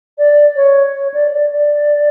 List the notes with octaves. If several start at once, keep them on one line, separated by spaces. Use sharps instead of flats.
D5
C#5
C#5
D5
D5
D5